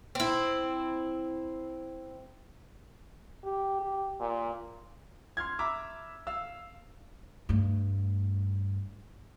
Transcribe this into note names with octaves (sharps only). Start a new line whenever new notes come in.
C4 E4
G4
G4
A#2
C6 F6 G#6
E5 A#5 B5 D6 E6
F5 E6
G2 A3